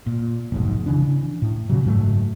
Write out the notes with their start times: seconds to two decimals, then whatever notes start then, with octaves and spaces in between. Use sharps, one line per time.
0.06 A#2
0.52 F1 B1 G#2
0.86 C#3 E3 D4
1.42 A2
1.70 A#2 C#3 F#3
1.84 F#1 G#2 F#3 A3